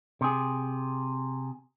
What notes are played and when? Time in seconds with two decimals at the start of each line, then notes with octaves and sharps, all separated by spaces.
0.21 C3 G#4